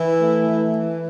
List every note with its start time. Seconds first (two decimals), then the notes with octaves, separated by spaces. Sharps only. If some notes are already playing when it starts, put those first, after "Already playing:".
Already playing: E3 E4
0.20 A3
0.48 E3
0.76 E3